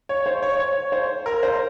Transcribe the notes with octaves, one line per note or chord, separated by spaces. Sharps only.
C#5
C5
C#5
C#5
C5
A#4
C5